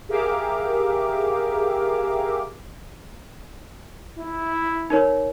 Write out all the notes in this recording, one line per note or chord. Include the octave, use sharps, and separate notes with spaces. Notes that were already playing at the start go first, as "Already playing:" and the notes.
G4 G#4 A#4 E5 F5 D6
E4
D#4 A#4 C#5